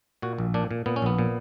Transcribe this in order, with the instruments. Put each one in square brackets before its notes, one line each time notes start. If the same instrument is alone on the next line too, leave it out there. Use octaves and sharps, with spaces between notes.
[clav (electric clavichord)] A#2 F#4
A#1
A#2 D4
A#2
A#2 B3
C#4
A#1 B3
A#2